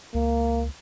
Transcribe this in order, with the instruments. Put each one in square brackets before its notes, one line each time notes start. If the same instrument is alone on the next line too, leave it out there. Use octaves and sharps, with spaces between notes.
[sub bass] C#2 [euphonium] A#3